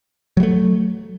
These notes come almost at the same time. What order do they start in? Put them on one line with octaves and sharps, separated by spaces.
F#3 G3 A3